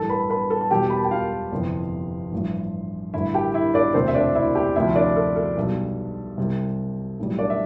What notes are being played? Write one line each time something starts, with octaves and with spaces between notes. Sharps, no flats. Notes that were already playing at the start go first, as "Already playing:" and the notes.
Already playing: A1 G2 E3 G3 A4 A5
B4 B5
B4 B5
A4 A5
A5
E1 E2 B2 G3 G4 G5
B5
A5
G5
F4 F5
G1 F2 C3 E3 G3
A1 G2 F3
A1 G2 D3 E4 E5
G4 G5
E4 E5
D4 D5
E1 D2 C3 C4 C5
E5
D4 D5
E4 E5
G4 G5
D2 C3 F3 E4 E5
D4 D5
A4
A4
B1 B2 G3
C2 C3 G3
B1 A2 E3 G3
D4 D5
E5